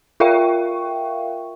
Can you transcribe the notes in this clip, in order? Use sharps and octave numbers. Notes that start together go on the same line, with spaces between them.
F4 A#4 E5 F5 G5 C#6